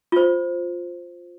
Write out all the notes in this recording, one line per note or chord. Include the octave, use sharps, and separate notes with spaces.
F4 C5